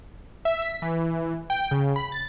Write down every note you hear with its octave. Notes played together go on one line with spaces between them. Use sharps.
E5
B6
E3
G5
C#3
B5
A6